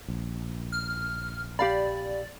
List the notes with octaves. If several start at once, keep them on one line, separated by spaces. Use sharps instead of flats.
A#1
F6
G4 D5 F5 B5